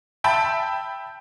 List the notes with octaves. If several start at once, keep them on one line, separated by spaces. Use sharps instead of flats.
E5 G5 A5 B5